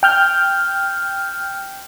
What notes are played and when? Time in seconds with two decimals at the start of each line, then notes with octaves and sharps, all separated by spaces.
0.03 G5 F6 G6